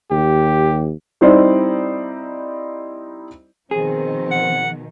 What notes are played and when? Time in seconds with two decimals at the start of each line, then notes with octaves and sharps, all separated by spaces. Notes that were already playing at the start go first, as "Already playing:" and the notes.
0.11 D#2 G4
1.21 G3 C4 D#4 E4 C5 D5
3.71 B2 D#3 F3 C4 G#4
4.31 F#5